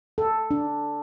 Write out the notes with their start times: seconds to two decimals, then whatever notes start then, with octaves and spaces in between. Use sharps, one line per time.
0.18 A4
0.51 D4